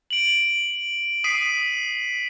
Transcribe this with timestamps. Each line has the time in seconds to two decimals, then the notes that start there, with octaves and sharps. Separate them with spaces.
0.10 D7 F#7
1.24 D#6 B6 C7 D#7